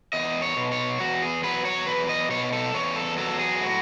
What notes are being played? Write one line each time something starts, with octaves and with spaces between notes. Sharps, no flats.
E2 D#5
C#5
B2
C#5
E2 F#4
G#4
F#3 B4
C#5
E2 B4
D#5
B2 C#5
A4
E2 C#5
A4
F#3 A4
G#4
A2 F#4